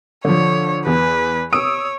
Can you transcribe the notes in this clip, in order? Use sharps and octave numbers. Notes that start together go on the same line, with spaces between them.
D3 F3 C#5
E2 B4
C#5 D#6 E6 D7